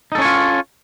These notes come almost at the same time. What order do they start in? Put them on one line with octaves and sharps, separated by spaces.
D#4 A4 C#4 C#5 F4